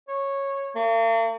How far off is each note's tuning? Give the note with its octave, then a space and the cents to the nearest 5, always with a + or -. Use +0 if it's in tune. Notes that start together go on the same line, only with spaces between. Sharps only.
C#5 -10
A#3 -45